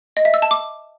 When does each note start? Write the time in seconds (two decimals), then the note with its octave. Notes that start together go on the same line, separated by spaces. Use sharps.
0.17 D#5
0.25 E5
0.34 E6
0.42 A5
0.51 D6